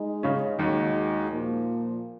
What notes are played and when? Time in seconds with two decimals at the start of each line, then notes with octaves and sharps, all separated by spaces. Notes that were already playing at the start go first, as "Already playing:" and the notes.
Already playing: G#3 D#4 G#4
0.23 C#3 C#4
0.59 D#2 D#3 G#3 D#4 F#4
1.30 A#2 F3 A#3